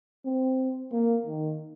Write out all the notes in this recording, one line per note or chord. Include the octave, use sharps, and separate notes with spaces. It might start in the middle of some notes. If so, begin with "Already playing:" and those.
C4
A#3
D#3